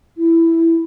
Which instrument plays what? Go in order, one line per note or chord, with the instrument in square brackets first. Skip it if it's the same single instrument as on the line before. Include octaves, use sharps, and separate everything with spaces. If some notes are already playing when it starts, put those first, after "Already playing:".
[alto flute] E4